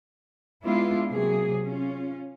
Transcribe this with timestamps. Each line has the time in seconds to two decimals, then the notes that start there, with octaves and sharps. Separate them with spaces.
0.64 G#3 B3 D4 E4 F4
1.10 C3 F#3 A#3 G#4
1.63 C#4 F4